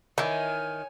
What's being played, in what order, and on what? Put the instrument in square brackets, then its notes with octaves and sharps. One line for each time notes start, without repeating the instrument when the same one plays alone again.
[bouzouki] D#3 [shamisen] E3 E4 [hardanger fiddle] C#5 G#5